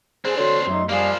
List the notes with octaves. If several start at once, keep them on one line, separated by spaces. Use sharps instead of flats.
C4 D4 G#4 C5
D3 F#4 A4 C#5 C6
F#2 F#3 A3 D#4
F3 G3 A#3 G#4 F5